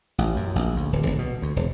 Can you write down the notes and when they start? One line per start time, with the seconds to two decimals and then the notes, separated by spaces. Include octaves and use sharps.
0.18 A1
0.36 F#2
0.56 A#1
0.76 D2
0.93 D1
1.06 G1
1.19 B2
1.42 D2
1.56 E1